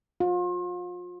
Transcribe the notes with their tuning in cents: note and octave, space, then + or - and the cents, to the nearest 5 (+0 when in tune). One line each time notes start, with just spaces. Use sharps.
F4 +35